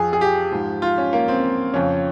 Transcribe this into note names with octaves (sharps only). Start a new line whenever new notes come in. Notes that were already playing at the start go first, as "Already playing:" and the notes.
Already playing: F2 F3 G#4
G#4
G4
G#2 F3
F4
C#4
A#3
C4
F2 C#3 F3 C#4